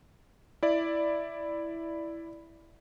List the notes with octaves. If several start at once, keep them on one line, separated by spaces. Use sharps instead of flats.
E4 D5